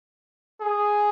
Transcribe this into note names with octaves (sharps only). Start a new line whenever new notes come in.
G#4